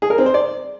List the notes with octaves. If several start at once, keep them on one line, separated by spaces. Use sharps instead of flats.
G#4
A#4
C4
C5
D5